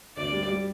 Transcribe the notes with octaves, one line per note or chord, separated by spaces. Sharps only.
D2 D5
G3
G3